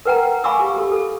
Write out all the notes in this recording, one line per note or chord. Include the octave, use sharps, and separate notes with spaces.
A#4 B4 F#5 G5 A#5
F5 G#5 B5 C#6 D6 E6
G4
G4 A4
A4